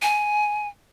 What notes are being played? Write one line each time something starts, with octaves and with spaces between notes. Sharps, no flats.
G#5